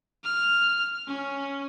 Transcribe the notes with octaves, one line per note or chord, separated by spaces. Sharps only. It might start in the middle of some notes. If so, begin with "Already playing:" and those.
F6
C#4